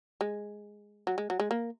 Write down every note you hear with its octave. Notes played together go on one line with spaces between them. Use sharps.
G#3
F#3
G#3
F#3
G#3
A#3